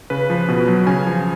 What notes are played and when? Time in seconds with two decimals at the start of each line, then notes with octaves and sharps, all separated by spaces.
0.10 C#3 B4
0.30 F3
0.48 B2
0.67 F#3
0.87 C#3 G#5
1.06 F3